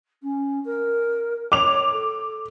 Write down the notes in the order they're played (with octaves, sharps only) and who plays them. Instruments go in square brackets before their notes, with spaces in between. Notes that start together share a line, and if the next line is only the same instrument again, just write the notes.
[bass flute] C#4
A#4
[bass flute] C#5 [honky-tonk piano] D6 F7
[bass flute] A4